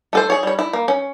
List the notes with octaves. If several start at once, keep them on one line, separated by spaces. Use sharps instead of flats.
A3 A4 C5
G#4 C#5
G3 C#5
E4
A#3
C#4